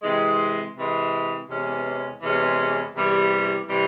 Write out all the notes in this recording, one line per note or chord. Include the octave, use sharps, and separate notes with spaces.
C3 E3 G#3
C3 E3 G#3
E2 C3 E3 G#3 C#4
E2 C3 E3 G#3 C#4
E2 C3 E3 G3
C3 E3 G3